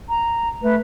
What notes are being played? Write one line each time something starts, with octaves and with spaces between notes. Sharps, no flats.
A#5
A3 B4